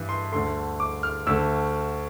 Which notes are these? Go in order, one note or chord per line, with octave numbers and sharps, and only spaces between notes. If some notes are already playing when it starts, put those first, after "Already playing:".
Already playing: G2 E3 G3
C6
D2 D3 A3 C6
D6
F6
D2 D3 A3 E6